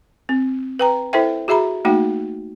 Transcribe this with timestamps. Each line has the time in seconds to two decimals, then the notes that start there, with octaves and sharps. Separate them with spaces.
0.29 C4
0.79 B4 G5 A#5
1.13 E4 A4 C5 E5 G5
1.48 F#4 G#4 E5 A#5 B5
1.85 A3 A#3 D#4 F#4 G5